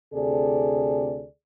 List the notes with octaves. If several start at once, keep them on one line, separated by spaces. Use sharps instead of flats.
D2 C3 G#4 A4 D5